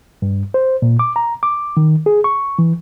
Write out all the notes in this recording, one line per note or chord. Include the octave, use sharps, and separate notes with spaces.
G2
C5
A#2
D6
A#5
D6
D#3
G#4
C#6
E3